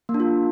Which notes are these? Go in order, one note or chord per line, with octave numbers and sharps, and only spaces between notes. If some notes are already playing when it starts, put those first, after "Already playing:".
A#3
D4
F4